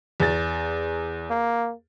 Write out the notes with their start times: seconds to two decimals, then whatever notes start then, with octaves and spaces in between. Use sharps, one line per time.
0.20 E2 A6
1.30 A#3